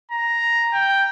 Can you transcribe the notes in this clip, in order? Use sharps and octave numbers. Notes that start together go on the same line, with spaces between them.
A#5
G5